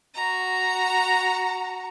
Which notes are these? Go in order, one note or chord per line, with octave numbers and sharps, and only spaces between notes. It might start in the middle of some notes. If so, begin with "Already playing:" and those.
F#4 A#5